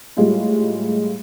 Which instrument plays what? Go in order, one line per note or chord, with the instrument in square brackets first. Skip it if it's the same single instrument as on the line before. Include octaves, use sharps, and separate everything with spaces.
[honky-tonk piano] A2 G3 G#3 F4